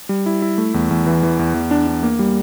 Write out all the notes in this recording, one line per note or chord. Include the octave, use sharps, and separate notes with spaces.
G3
E4
E4
A3
E2
E2
E3
E3
E2
E2
D4
D4
A#3
G3